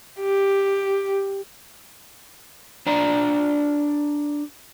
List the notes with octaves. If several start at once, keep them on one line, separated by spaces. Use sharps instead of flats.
G4
D4 C5 D5 A#5